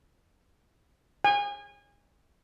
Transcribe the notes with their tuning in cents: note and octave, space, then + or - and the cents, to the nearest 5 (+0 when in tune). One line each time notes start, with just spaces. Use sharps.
G#5 -30